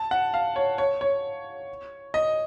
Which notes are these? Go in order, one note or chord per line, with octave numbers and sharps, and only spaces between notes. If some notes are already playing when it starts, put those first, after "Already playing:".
Already playing: A5
F#5
F5
C#5
C#5
C#5
D#5